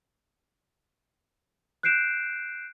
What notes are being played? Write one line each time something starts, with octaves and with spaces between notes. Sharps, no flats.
F#6 G6 C7 D7 E7